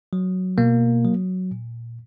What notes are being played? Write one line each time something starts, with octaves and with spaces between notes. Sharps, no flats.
F#3
B2 A#3
F#3
A#2